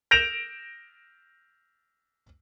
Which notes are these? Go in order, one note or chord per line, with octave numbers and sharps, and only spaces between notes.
G6 A#6 D7 E7 F7